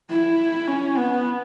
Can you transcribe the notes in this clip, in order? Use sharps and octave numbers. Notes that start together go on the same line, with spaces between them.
E4
C#4
B3